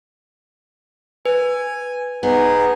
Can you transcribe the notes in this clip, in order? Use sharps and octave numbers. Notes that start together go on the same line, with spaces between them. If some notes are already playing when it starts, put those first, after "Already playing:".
B4 G#5
B3 D#4 G#4